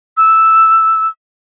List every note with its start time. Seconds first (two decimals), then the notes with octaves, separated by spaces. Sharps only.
0.17 E6